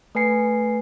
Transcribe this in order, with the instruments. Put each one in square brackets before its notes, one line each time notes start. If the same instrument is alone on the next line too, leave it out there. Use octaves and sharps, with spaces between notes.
[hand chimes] A3 B4 G#5 C7 C#7